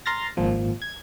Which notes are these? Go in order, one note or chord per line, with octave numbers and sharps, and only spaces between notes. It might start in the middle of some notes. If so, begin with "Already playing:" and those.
A#5 C6 F6 A6 A#6
G#1 A#2 F3
G#6